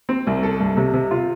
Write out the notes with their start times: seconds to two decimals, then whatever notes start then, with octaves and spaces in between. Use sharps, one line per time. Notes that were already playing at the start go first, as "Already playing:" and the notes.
0.09 C4
0.27 C2
0.43 A4
0.60 G2
0.77 C3
0.93 C3
1.11 F4